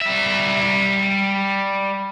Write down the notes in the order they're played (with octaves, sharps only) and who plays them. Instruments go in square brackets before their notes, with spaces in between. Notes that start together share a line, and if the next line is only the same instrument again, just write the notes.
[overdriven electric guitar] G3 E5